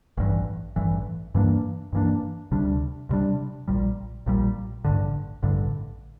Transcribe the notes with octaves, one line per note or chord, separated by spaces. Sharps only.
A1 G2 E3
A1 G2 E3
G2 E3 A#3 D4
G2 E3 A#3 D4
D2 C3 G3 D4
D2 C3 G3 D4
A#1 A#2 G3
A#1 A#2 G3
A1 G2 D3
A1 G2 D3